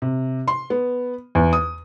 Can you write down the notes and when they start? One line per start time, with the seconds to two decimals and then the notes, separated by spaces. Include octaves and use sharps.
0.02 C3
0.48 C6
0.70 B3
1.35 E2
1.53 D#6